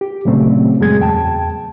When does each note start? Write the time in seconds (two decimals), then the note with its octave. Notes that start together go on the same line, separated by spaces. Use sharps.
0.01 G4
0.25 A#2 C#3 F#3 A3 C4
0.80 F#2 F#3 G#3 G#4 G#6
1.00 E2 G5 A5